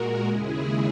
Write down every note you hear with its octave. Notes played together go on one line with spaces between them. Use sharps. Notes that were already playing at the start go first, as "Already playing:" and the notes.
Already playing: A#2 G#3 F#4 A#4
D#2 C#3 G#3 E4 G#4